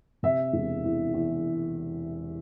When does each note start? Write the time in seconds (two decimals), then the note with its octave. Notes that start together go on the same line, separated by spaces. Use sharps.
0.23 C3 E5
0.53 E1
0.84 E2
1.14 E2